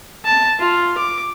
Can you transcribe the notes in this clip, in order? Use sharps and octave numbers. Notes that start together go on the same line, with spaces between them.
A5
F4
D6